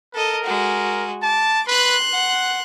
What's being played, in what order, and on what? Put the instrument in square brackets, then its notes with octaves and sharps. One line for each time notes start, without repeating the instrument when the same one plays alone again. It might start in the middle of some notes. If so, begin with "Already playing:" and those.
[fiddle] A4 D#5 [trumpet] A#4
[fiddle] G#3 F#4
[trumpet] A5 [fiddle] D6
[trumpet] B4 [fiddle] C6 F#6
[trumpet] F#5